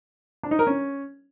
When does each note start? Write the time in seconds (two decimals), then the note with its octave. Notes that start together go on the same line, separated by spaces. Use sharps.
0.43 D4
0.51 D#4
0.59 A#4
0.67 C#4